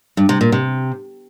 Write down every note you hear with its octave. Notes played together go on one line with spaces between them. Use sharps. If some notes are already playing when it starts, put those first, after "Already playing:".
G2
C3
A#2
C3